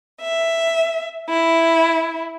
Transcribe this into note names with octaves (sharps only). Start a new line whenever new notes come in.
E5
E4